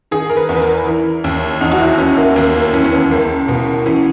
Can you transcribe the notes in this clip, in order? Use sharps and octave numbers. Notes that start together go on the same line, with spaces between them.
D#3 G#4
A#4
B4
E2
B4
A#4
E3
D#2
E2 D#4
F#4
E4
E3 C#4
A#3
D#2 A#3
A#3
E3 C#4
C#4
B3
C#2 A#3
B2 B3
E3 C#4